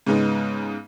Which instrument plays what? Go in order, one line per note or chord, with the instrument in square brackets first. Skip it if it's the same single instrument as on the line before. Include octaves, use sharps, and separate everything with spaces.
[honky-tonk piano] G#2 C#3 G#3 B3 D#4